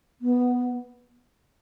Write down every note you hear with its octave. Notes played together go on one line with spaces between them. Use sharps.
B3